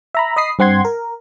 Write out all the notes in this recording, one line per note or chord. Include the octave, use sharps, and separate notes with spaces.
E5 A#5 B5
D#5 B5 D#6 C7
G2 C4 F#5 C6 G#6
A#4